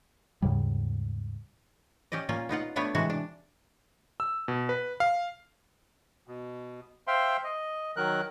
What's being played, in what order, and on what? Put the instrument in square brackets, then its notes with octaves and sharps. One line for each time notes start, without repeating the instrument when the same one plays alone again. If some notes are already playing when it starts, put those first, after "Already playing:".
[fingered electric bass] D#2 G#2 C#3 G3
[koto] C#4 G4 D5 D#5
A#2 A#3 C#4 F4
B3 D#4 F4 F#5
A3 B3 D4 B4 C#5
C3 E3 G#3 F#4
D4
[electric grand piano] E6
B2
B4
F5
[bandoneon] B2
C5 E5 F5 G5 C6
D#5
D#3 F#3 A#4 F#6